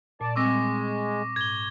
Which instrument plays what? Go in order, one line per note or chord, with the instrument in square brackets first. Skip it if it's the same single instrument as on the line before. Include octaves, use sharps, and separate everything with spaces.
[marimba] A#2 [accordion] D5 A5
[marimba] G3 C4 E6 [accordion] G#3 [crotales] C#6 D6 A#6
[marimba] G#2 [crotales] G#6 G7